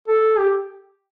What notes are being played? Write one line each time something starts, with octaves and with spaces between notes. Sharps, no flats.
A4
G4